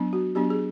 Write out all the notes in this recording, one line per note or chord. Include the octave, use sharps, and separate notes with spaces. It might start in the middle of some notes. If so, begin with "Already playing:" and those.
Already playing: F#3 B3 D4
F#4
F#3 B3 D4 G4
G#4